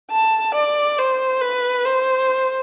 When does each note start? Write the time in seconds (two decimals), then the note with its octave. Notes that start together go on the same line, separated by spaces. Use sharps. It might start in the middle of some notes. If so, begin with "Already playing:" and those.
0.11 A5
0.55 D5
0.98 C5
1.41 B4
1.85 C5